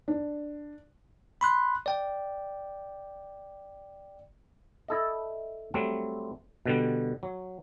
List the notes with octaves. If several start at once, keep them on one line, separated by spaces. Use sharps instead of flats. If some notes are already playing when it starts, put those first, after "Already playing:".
D4
B5 C6 F#6
D5 G5
E4 A4 D#5
F#3 G3 A3 C4
B2 D3 G3
F#3